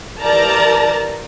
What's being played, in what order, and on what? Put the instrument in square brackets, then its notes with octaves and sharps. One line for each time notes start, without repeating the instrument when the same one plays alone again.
[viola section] E3 G4 A#4 D5 A5 A#5